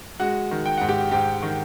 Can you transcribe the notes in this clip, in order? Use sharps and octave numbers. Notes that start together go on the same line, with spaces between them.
G#3 F#4 F#5
D#3
G5
G#2 F#5
G4 G5
G#2 G4 G5
D#3